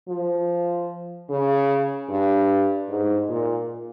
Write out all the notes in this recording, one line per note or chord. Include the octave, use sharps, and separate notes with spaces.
F3
C#3
G2
G#2
A#2